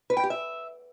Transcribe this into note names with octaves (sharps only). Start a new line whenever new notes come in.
B4
G5
G4
E5